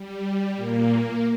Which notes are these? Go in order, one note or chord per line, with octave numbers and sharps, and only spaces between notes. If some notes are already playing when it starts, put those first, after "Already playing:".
Already playing: G3
A#2 A#3